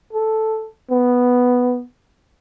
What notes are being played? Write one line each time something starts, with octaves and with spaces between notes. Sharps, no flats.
A4
B3